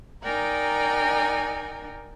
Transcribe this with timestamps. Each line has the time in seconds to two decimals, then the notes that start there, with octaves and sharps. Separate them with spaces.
0.23 D#4 A#4 D5 G5 G#5 A#5